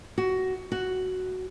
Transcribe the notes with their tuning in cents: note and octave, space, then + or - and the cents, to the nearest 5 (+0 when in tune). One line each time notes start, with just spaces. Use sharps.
F#4 +15
F#4 +5